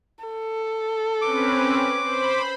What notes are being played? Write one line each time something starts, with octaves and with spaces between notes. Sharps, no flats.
A4
C4 C#4 B4 D6
C5 B5